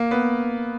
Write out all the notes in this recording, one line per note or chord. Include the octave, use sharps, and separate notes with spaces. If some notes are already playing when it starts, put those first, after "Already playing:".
Already playing: A#3
B3